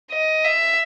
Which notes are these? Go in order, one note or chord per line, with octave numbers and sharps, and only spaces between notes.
D#5
E5